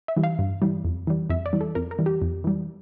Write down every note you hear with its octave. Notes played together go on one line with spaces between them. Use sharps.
E5
E3 G3
F5
G2
E3 G3
F2
E3 G3
F2 E5
D5
E3 G3
A4
F2 A#4
A#4
E3 G3
G4
F2
E3 G3